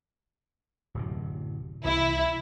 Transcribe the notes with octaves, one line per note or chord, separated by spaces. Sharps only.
D1 F#2 C3
C2 C3 E3 E4